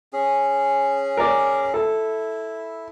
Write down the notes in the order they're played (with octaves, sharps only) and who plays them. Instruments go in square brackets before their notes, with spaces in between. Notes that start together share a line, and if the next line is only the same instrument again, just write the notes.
[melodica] C#4 G#4
[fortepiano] A#4 D5
[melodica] E4 [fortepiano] A4